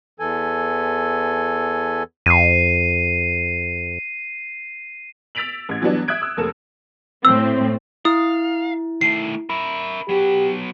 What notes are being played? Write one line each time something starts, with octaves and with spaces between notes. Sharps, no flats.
E2 E3 A4 G#5
F2 C7 D#7
E6 A6 B6 D7 F7 F#7
A1 G#6
E3 F#3 G3 B3 D4
E5 D#6 F#6 G#6 D7
E6
F1 A#3 A4 E7
A2 C4 E6
E4 F5 D#6
D#3 A3 C7
A#4 E5 B5
F#3 B3 G4